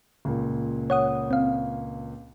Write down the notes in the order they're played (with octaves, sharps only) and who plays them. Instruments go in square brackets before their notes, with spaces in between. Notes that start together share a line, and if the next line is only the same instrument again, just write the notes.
[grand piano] C#2 A#2
[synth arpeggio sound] C#5 F#5 D#6
C4 F5